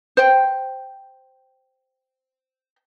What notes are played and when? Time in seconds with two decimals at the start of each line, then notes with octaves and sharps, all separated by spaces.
0.17 C5 G5